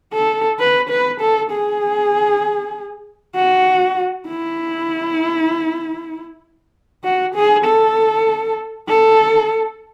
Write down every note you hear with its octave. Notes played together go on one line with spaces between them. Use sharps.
A4
B4
B4
A4
G#4
F#4
E4
F#4
G#4
A4
A4